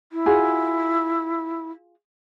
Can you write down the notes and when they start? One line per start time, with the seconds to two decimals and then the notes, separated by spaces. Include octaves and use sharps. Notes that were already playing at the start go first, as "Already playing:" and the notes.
0.12 E4
0.26 F4 F#4 G#4